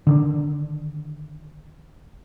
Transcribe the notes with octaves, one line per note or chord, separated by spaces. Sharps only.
D3 D#3 D4